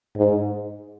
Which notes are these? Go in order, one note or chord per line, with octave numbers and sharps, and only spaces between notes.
G#2